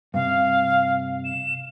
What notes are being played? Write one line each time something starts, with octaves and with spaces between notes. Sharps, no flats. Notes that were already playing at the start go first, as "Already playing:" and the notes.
G2 C3 F5
E7